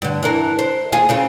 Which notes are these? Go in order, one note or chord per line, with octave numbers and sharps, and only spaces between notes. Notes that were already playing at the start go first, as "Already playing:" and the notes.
G2 D3
E3 D4 A#4
C5
D#2 F4 G#4
C#3 C4 F4